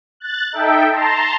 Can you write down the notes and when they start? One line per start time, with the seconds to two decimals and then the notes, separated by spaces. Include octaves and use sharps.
0.20 F#6 A6
0.52 D#4 A4 E5 G5
0.91 A5 A#5 C6